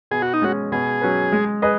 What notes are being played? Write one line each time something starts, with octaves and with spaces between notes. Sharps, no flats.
B2 G#4
F#4
D#4
G#3 C#4 F#4 G#4
B2 G#4
F#3 C#4 B4
G#3
G#4 B4 D#5